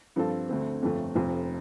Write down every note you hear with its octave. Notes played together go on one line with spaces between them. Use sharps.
G2 F3 C4 F4 A4
D2 D3 A3 C4
G1 F2 F3 A3
F1 F2 F3 A3